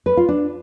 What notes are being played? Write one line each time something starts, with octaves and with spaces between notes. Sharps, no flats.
B4
F4
D4